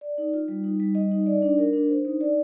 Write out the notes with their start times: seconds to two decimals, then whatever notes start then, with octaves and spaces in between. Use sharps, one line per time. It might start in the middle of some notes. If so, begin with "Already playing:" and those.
0.01 D5
0.18 D#4
0.34 F4
0.48 G3
0.64 D#4
0.80 G3
0.95 D#5
1.11 D#4
1.26 D5
1.42 D4
1.59 A#4
1.73 D4
1.89 C5
2.05 D#4
2.21 D5